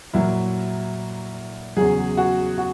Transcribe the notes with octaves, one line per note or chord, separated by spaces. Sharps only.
A#2 F#3 E4
E2 C#3 F#3 G#4
F#4
F#4